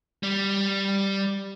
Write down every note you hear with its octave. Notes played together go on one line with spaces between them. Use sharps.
G3